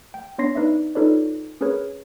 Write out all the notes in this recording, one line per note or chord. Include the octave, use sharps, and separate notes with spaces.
G5
B3 D4 C#5 C6 A#6 C7
D#4 B4 D5 E5
D#4 F4 A4 B4 C#5 D5
C#4 G#4 A#4 B4 C#5